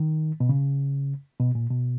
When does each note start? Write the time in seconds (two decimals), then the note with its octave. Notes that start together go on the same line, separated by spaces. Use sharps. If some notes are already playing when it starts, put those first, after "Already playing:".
Already playing: D#3
0.40 B2
0.49 C#3
1.40 B2
1.55 A#2
1.70 B2